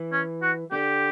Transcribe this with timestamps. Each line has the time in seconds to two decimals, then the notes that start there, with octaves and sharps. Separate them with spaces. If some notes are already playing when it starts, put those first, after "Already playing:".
Already playing: E3
0.12 C#4
0.42 F#4
0.72 D3 G4